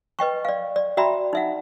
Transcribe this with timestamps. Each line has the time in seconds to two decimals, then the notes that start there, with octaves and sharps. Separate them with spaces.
0.19 B4 D#5 G5 C#6
0.45 D5 F5
0.76 D5
0.97 F#4 D5 E5 G5 A#5 B5
1.33 D#4 E5 F#5